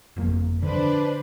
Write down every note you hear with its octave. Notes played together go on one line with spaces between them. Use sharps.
G1 F2 A#3
D3 F3 D4 B4 C5